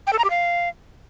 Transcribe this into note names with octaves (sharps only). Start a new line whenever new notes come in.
G5
A4
A#5
G4
F5